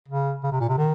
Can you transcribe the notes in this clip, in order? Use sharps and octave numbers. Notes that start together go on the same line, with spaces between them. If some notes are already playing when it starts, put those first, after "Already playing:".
C#3
C#3
C3
A#2
C3
D#3